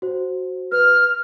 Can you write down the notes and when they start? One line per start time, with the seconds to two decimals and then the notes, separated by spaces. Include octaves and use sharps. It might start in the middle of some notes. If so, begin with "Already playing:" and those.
0.02 F#4 C5
0.72 B4 F6